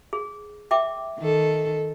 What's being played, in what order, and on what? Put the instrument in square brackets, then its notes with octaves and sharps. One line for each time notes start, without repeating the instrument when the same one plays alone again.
[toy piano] G#4
E5 G5 D6
[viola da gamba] D#3 A4